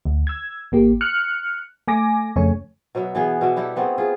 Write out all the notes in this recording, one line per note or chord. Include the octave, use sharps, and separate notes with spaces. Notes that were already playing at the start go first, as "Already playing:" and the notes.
D2
E6 G#6
G#1 A#3 G4
F6 F#6 C#7
A3 G#5 D6 A#6
F2 C#3 A3 C#5 G#5
B2 F#3 B3 E5
E3 B3 G#4 B4
B2 F#4 D5 E5
G3 E4 G4 A4
A3 B3 C4 G#4
F4 G#4